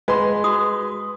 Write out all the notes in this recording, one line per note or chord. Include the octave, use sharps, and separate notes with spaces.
G#3 B4 C6
F#4 D#6